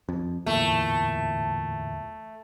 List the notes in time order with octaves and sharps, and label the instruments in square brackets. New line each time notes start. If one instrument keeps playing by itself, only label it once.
[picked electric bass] F2
[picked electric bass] D1 E2 A#2 [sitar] A3